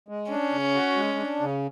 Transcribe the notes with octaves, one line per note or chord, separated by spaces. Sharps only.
G#3
C#4 D4
C#3
F#4
G#3
D4
C#3